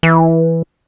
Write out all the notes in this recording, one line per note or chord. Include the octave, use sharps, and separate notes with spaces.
E3